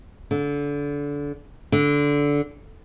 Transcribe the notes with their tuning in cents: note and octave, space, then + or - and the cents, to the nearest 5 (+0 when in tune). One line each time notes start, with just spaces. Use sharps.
D3 -25
D3 -15